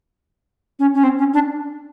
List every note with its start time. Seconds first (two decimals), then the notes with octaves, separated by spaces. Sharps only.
0.79 C#4
0.94 C#4
1.03 C4
1.18 C#4
1.34 D4